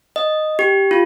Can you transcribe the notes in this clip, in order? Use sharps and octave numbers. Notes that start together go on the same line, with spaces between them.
D#5
G4
F4